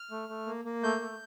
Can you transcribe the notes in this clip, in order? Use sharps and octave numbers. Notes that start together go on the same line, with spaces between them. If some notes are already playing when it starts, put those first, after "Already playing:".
Already playing: F6
A3
A3
A#3
A#3
A3 G6
A3